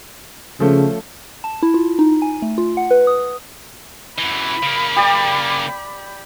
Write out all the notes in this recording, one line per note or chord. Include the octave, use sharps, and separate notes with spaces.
C#3 F3 A3 C#4
A5
E4
F4
D#4
G#5
A3
F4
F#5
B4
D#6
F#2 E3 B5
C#3 A#3
G4 D5